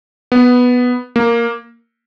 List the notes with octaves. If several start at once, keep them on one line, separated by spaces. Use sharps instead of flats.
B3
A#3